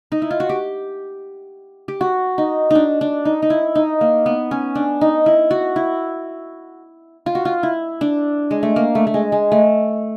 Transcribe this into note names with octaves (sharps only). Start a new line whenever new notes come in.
D#4
E4
F4
F#4
G4
G4
F#4
D#4
D4 D#4
D4
D#4
D#4
E4
D#4
A#3
B3
C#4
D4
D#4
E4
F#4
E4
F4
F#4
F4
E4
D4
G#3
A3
A#3
A3
A3
G#3
G#3
A3